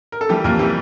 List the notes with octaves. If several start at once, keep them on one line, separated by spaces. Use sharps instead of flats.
A#4
A4
E3 G3 G4
F2 A#3 A#4
E3 G3 G4